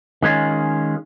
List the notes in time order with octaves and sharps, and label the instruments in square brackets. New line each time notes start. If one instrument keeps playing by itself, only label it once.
[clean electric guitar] D#3 G#3 C#4 F4